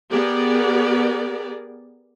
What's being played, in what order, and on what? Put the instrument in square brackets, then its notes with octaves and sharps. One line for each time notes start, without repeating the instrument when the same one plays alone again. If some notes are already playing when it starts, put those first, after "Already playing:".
[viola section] B3 G4 G#4 A#4 D5